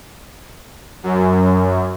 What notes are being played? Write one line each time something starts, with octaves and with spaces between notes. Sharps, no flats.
F#2